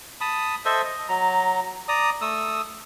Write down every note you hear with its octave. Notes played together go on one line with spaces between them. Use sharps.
A5 B5 D#6
A4 C5 D#5 E5
D#5
F#3 A#5
D5 A#5 D#6
A3 D#6 E6